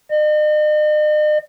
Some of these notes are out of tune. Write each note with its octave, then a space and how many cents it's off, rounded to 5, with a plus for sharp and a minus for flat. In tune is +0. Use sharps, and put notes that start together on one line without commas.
D#5 -45